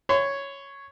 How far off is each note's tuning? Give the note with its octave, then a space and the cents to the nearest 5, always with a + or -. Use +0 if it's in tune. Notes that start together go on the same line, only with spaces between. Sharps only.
C#5 +0 C6 -45